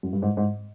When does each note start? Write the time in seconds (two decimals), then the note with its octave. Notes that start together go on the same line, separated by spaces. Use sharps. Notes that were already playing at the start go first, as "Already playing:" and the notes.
0.03 F#2
0.13 G2
0.22 G#2
0.37 G#2